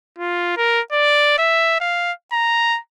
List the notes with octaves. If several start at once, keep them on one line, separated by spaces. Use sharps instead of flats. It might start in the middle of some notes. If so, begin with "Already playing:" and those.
F4
A#4
D5
E5
F5
A#5